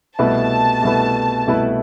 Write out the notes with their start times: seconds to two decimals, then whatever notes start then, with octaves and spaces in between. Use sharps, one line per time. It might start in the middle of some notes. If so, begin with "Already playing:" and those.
0.19 C2 B2 A3 E4 B4 A5
0.83 C2 B2 A3 E4 B4
1.47 C2 B2 A3 E4 B4